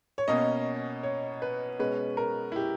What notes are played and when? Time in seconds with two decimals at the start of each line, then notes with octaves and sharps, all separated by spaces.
0.18 C#5
0.28 B2 A#3 C#4 D#5
1.03 C#5
1.42 B4
1.79 B2 G#3 C#4 B4
2.17 A#4
2.52 E4
2.56 G4